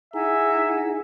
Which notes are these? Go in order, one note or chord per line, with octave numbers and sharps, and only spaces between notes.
D#4 E4 G#4 E5 F#5 G#5 A#5